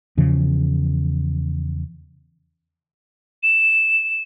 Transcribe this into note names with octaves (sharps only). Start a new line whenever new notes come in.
E2 C#3 F3
E7